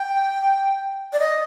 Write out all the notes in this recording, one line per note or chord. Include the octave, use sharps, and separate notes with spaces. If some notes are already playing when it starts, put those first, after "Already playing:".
Already playing: G5
D5
D#5